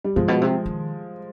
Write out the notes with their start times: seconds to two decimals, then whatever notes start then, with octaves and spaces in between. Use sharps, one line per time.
0.04 G3
0.16 G2 F3 G#3
0.28 B2
0.41 C3
0.66 D#3